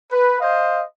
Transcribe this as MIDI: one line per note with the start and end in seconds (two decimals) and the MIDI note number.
0.11 0.38 71
0.40 0.83 72
0.40 0.83 75
0.40 0.83 77